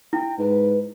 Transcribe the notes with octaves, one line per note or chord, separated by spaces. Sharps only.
E4 G5
G#2 B4